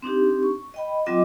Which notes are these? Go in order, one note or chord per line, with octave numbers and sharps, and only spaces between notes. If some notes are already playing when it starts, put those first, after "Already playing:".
C4 D4 D#4 G4
C#6
D#5 G5 B5
F#3 C4 F4 D#5 G5 D6